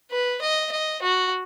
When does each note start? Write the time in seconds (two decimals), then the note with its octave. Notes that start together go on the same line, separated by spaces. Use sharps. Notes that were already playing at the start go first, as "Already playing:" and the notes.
0.11 B4
0.41 D#5
0.72 D#5
1.02 F#4